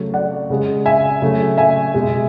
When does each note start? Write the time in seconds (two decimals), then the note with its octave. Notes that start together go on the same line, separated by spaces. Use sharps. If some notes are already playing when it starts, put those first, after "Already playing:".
Already playing: C#3 F#3 A3
0.14 D5 F#5
0.50 C#3 G#3
0.86 E5 G#5
1.22 C#3 F#3 A3
1.57 E5 G#5
1.95 B2 G#3